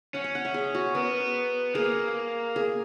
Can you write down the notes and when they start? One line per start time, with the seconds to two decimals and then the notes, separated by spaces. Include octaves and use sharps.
0.14 C#4 F#5
0.24 F#5
0.35 F#5
0.45 E5
0.54 G#4
0.75 F#4
0.95 B3 A#4
1.75 A#3 G#4
2.56 G#4